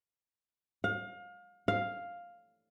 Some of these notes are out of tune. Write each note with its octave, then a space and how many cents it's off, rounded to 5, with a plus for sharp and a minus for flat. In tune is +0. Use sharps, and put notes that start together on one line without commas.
F5 +30
F5 +5